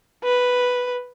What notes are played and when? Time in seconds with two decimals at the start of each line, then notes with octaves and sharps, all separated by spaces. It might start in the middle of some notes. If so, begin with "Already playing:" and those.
0.24 B4